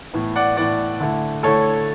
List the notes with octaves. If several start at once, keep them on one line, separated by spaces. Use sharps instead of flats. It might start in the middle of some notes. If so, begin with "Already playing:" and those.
A2 E3 B3
D5 F#5
A2 E3 B3 D5 F#5
D3 A3 E4
D3 A3 E4 A4 C#5